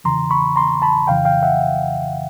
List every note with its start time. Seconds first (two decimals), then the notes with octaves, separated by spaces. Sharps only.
0.04 E2 C#3 E3 A#5 C6
0.31 B5 C#6
0.56 A#5 C6
0.82 A5 B5
1.07 F2 C#3 E3 F5 G5
1.25 F5 G5
1.43 E5 F#5